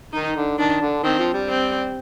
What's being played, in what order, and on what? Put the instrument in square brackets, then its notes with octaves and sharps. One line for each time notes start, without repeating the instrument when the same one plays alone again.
[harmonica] D#3 [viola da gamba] D#4
[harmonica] D3
[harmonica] D#3 [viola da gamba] D4
[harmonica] D3
[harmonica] D#3 [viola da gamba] C4
[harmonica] F3
G3
[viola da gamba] C4